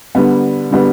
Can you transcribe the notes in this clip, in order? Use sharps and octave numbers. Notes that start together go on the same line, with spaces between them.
D3 G3 B3
D3 G3 B3